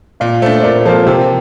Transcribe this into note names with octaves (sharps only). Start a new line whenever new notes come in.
A#2 D5 F5
A3 D4 C5 E5
A#2 A#4 D5
F3 A#3 F4 A4 C5
C3 G4 A#4